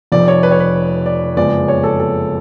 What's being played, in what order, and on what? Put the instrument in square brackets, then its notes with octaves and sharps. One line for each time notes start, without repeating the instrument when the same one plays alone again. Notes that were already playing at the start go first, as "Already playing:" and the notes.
[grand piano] F1 F2 F3 D5
C#5
B4
C#5
B4
D5
F#1 F2 F3 G#3 B3 D5
C#5
A4
A4